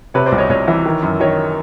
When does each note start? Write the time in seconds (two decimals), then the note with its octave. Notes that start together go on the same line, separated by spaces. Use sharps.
0.14 C3 B4 C#5
0.26 C5 D5
0.32 C2
0.38 C#5 D#5
0.50 C2 C#5 D#5
0.68 E3
0.86 D#3
1.02 F#2
1.20 D#3 C#5 D#5